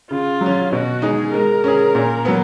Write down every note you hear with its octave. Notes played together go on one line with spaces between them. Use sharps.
C#3 F4
F#3
C#4
B2 F#4
G#3 D#4 G#4
G#3 A#4
C#4 G#4
A#2
F#3 B3